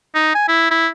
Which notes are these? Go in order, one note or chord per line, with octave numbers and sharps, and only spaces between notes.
D#4
G#5
E4
E4